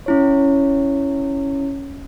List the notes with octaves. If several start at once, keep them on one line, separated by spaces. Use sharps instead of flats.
C#4 E4 C#5